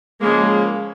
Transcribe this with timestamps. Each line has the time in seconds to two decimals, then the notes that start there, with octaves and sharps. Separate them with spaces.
0.21 C#3 F3 G#3 A#3